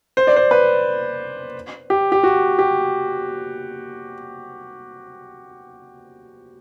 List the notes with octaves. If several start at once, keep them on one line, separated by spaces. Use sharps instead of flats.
C5
D5
C5
B4
G4
G4
F#4
G4